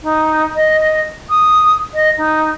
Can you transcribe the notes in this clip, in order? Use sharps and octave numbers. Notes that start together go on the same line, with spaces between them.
D#4
D#5
D#6
D#5
D#4